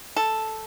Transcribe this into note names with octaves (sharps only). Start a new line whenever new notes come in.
A4